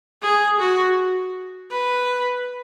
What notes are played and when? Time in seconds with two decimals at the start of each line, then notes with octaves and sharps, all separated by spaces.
0.22 G#4
0.59 F#4
1.71 B4